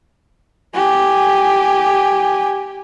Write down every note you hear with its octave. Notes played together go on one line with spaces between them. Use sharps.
G4 G#5